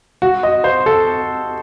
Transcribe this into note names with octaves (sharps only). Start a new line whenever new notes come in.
F#4
D#5
C5
A4